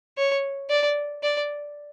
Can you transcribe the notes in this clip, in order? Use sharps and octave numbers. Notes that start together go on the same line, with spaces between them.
C#5
D5
D5